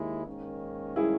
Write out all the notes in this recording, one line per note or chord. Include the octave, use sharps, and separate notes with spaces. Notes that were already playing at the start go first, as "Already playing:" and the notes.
Already playing: D#2 G#3 E4
G#2 D#3 A#3 C#4
E4 G#4